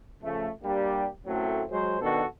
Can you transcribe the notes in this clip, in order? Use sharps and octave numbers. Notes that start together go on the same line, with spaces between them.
C#3 F3 A3
G3 A#3 D4 G4
F#2 A2 F#3 A3 C4
F#3 G#3 G#4 C5
B2 D#3 D4 F#4 A4